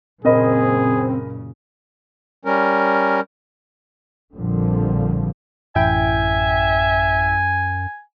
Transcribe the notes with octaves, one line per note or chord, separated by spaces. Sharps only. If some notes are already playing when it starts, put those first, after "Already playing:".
F#1 A#2 C#3 C4 G#4 A#4 D#5 B5
G3 C#4 A#4
A#1 F2 A#2 D3 F3 G3
A1 F#2 E4 E5 G5 G#5